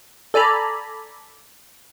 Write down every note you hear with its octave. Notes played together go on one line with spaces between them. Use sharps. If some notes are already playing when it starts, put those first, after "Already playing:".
A4 D5 G#5 A#5 B5